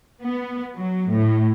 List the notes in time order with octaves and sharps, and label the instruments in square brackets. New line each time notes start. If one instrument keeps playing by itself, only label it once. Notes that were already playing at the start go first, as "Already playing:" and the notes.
[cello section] B3
F#3
A2